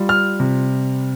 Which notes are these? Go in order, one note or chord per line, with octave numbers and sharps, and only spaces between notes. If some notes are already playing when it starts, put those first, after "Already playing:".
Already playing: G3 F4
F6
C3